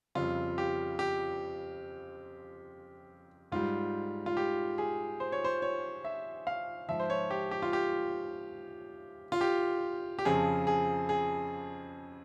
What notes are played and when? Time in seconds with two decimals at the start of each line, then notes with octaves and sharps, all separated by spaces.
0.15 F2 C#3 G3 F4
0.58 G4
0.99 G4
3.52 G#2 G3 F4
4.26 F4
4.37 G4
4.78 G#4
5.20 C5
5.32 C#5
5.44 C5
5.62 C#5
6.05 E5
6.47 F5
6.88 G#2 F3 E5
7.00 C5
7.10 C#5
7.31 G4
7.51 G4
7.62 F4
7.73 G4
9.32 F4
9.41 G4
10.19 G4
10.25 F2 C#3 F3 G#4
10.67 G#4
11.09 G#4